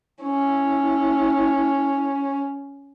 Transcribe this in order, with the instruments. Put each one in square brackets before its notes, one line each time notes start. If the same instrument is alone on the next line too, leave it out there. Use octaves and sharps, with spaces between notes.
[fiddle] C#4 [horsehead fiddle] E4